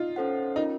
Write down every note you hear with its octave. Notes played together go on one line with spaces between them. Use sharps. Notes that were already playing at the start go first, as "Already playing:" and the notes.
Already playing: D#4 F4
C#4 A4 C5 F#5
C#4 D#4 F4 A#4